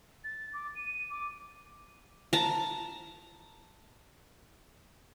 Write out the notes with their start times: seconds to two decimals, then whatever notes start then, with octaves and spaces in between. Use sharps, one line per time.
0.24 A6
0.53 D6
0.75 D#7
1.10 D6
2.33 A5 A#5